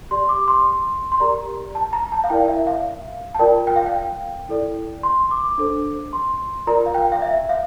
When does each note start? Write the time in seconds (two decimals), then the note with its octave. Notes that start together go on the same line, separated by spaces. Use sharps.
0.11 G4 D5 C6
0.29 D6
0.48 C6
1.12 C6
1.20 G4 A#4 D5 A#5
1.75 A5
1.93 A#5
2.12 A5
2.24 F5
2.30 E4 A#4 D5 G5
2.48 E5
2.67 F5
3.35 A5
3.39 F4 A#4 D5 G5
3.67 G5
3.76 F5
3.86 G5
4.49 E4 A4 D5
5.03 C6
5.31 D6
5.58 D4 A4 C5
6.13 C6
6.67 F4 A#4 D5 A#5
6.86 F5
6.94 G5
7.12 F5
7.22 E5
7.49 F5